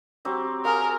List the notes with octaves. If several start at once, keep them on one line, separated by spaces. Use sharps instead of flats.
F#3 C4 G4
G#4 A#4 F5